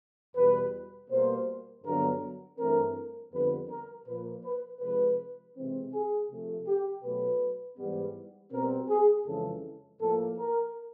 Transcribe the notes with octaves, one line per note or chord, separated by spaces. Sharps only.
E2 B2 G3 B4
B2 G3 A#3 C5
G2 D3 F#3 B3 A#4
G2 E3 A3 C4 A#4
F2 D3 G3 B3 B4
A#4
A#2 F3 A#3 B4
B4
C3 F3 G#3 B4
C3 E3 G#3 C4
G#4
C3 F3 A3
G4
B2 F#3 A3 B4
G#2 E3 G3 B3
B2 G3 C4 A#4
G#4
F2 C#3 E3 G#3 A4
A2 F3 A#3 A4
A#4